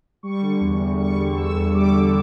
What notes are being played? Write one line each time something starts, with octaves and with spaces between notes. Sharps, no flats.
G3 C#6
D3
E2
E2
G3 C#6
D3
E2 E6
E2
G3 D6
D3